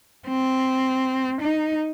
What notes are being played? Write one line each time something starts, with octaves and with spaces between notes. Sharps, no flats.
C4
D#4